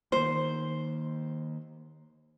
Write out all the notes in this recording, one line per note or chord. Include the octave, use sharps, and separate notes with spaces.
D#3 A#3 C5